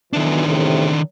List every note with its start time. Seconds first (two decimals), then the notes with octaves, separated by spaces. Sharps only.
0.13 B1 B2 D#3 E3 D4
0.46 E2 A2 C3